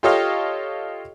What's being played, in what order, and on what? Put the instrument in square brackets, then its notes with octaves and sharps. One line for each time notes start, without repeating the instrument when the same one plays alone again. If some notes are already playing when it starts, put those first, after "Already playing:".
[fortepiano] F4 G4 A4 C#5 D#5 F5